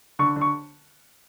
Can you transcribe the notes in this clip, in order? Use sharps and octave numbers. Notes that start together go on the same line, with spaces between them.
D3 C#6
D3
C#6